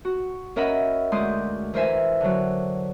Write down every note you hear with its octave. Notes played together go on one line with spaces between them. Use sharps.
F#4
C#4 A#4 D#5 E5 F#5 B5
D2 G#3 C6 D6 D#6 G6
E3 A#4 C5 E5 G#5
D3 F#3